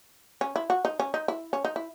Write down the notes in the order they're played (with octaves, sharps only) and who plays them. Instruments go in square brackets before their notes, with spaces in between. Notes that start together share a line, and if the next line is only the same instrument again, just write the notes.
[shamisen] C#4
E4
F#4
D#4
C#4
D#4
E4
C#4
D#4
E4